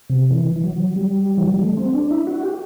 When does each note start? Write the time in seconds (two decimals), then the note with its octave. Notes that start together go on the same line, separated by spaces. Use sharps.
0.10 C3
0.31 E3
0.56 E3
0.63 F#3
0.96 G3
1.38 E3
1.45 F#3
1.54 G3
1.61 A3
1.77 C4
1.94 D4
2.11 E4
2.27 F#4
2.43 G4